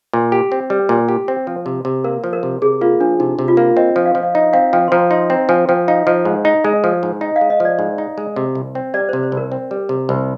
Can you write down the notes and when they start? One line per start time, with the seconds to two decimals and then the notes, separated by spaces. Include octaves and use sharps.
0.13 A#2
0.32 G4
0.52 C4
0.70 G3
0.89 A#2
1.09 G4
1.28 C4
1.47 F3
1.66 C3
1.85 C3
2.04 A#3 A#4
2.24 F3
2.33 A#4
2.43 C3
2.62 C3 G#4
2.81 A#3 F4
3.00 F3 D4
3.20 C3 D#4
3.39 C3
3.48 F4
3.57 A#3
3.77 C4 D#5
3.96 F3
4.06 F5
4.15 F3
4.23 F5
4.34 D#4 D#5
4.53 C4 F5
4.73 F3 G5
4.88 C6
4.92 F3 A#5
5.11 D#4 C6
5.30 C4 A#5
5.49 F3 G#5
5.68 F3 G5
5.88 D#4 F5
6.07 F3 D#5
6.25 G#2
6.45 D#4
6.64 G#3
6.84 F3
7.03 G#2
7.21 D#4 D#5
7.36 F5
7.41 G#3
7.50 D#5
7.60 F3 D5
7.79 G#2
7.98 D#4
8.18 G#3
8.36 C3
8.55 C2
8.75 C4
8.94 G3 D5
9.09 C3 C5
9.23 C5
9.32 C2
9.37 A#4
9.52 C4
9.71 G3
9.89 C3
10.09 C2